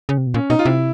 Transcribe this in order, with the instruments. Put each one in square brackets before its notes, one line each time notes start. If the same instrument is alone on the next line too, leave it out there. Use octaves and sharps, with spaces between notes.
[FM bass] C#3
C3
B2
[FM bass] A#2 [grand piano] C#4
[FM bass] B2 [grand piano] D#4
[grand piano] F4
[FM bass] C3 [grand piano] E4